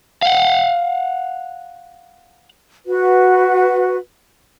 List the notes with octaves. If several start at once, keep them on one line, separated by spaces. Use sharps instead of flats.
F5 F#5
F#4 B4